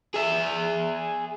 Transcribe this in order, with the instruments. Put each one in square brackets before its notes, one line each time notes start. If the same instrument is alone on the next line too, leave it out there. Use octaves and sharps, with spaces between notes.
[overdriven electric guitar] G#4 E5